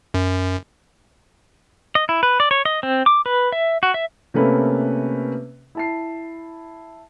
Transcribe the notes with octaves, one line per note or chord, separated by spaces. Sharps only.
F#2
D#5
E4
B4
D5
C#5
D#5
C4
D6
B4
E5
F#4
E5
C3 A3 A#3 C#4 B4
E4 A5 C7